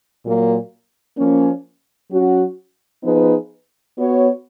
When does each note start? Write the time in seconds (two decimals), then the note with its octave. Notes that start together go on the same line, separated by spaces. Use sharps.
0.24 A#2 F#3 A#3
1.17 F3 A#3 C#4
2.11 F#3 C#4 F#4
3.03 F3 B3 D#4 G#4 B4
3.96 B3 F#4 C#5